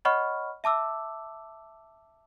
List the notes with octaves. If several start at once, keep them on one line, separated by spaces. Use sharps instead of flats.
C#5 D#5 F#5 B5 C#6 F6
E5 A5 D6 E6